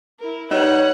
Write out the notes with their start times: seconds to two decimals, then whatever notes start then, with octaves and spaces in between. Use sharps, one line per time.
0.19 E4 A#4
0.51 G3 D#4 B4 C#5 F#5